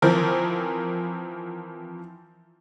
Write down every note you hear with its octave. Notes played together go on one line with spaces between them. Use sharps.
E3 F3 C4 A#4